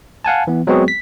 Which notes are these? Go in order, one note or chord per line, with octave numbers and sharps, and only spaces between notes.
F5 F#5 G#5 A5
E3 B3
F#3 G#3 B3 C4 F#4 G#4
B6